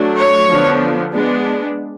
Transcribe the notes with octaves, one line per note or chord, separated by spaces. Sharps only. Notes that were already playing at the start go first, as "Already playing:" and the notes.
Already playing: F#3 A3 D4
C#5
D3 F3 B3 D4
G#3 B3 D4